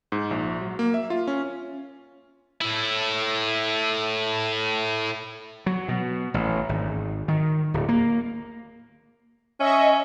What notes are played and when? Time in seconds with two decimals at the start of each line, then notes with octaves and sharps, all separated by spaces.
0.12 G#2
0.31 A#1
0.61 F#3
0.79 A#3
0.94 E5
1.10 F4
1.28 C#4
2.61 A2 E4
5.66 F#3
5.88 B2
6.34 A1
6.69 G#1
7.28 D#3
7.74 D1
7.89 A#3
9.60 C#4 D#5 E5 C#6